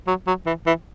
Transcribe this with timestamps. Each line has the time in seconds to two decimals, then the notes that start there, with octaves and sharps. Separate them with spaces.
0.07 F#3
0.27 F#3
0.46 E3
0.66 E3